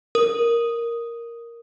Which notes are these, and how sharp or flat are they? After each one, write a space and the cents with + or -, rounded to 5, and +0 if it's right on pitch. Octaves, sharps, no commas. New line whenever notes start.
A#4 +0 D#6 +0